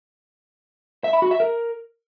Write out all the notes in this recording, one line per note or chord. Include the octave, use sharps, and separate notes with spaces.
E5
B5
F#4
E5
A#4